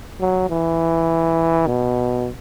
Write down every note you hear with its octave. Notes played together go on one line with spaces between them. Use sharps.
F#3
E3
B2